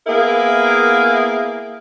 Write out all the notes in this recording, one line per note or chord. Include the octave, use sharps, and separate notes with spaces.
A#3 B3 E4 G#4 A#4 F5